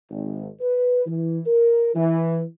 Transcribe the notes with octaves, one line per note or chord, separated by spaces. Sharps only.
G#1
B4
E3
A#4
E3